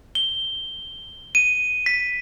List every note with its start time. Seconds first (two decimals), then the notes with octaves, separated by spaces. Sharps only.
0.15 G7
1.35 D#7
1.86 B6